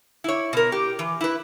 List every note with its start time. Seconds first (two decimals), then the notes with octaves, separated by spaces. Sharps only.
0.24 E4 C#5
0.53 B2 A#4
0.72 G4
0.99 E3
1.21 E4 B4